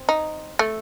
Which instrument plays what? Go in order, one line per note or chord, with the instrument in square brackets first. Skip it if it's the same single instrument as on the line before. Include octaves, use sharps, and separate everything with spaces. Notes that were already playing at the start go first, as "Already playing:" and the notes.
Already playing: [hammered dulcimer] C4
[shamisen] D#4
A3